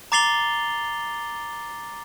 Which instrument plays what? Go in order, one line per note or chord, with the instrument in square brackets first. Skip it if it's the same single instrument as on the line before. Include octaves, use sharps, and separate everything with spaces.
[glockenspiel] A#5 D6 A6 C7 F7 G7